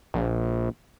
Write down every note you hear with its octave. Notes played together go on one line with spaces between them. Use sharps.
A#1